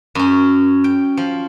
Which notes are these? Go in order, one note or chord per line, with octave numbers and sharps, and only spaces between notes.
F#2 C#4
G5
F3